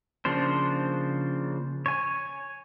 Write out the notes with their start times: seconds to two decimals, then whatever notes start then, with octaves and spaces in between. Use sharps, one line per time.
0.25 C#3 F3 A#3 D4 C5
1.86 C#5 G#5